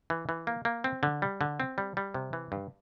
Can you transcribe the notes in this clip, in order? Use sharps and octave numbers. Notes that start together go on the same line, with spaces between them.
E3
E3
A#3
A#3
C4
D3
G3
D3
C4
G3
G3
C3
E3
G2